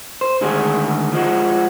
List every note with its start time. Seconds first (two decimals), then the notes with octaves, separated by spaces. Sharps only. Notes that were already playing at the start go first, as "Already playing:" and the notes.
0.21 C5
0.41 D2 D#3 G#3 F#4 G#4
1.13 F3 G#3 F#4